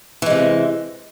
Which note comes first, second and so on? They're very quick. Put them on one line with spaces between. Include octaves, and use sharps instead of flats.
E3 G#3 C3